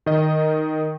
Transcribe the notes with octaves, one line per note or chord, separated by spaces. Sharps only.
D#3 D#5